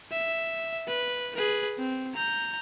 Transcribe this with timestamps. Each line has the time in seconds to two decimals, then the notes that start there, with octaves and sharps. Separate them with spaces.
0.12 E5
0.88 B4
1.35 G#4 B4
1.79 C4
2.15 A#5 G6